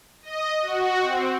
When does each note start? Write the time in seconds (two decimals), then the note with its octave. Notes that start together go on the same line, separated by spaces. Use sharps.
0.22 D#5
0.62 F#4
1.01 C4